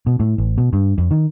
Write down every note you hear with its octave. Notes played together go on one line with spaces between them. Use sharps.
B2
A2
A1
B2
G2
F2
D#3